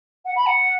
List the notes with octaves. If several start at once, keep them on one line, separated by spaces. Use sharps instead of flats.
F#5
B5
F#5